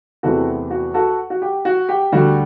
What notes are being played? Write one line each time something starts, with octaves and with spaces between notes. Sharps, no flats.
E2 C3 E3 A3 C4 F#4 A4
F#4
F#4 A4
F#4
G4
F#4
G4
D2 D3 G3 F#4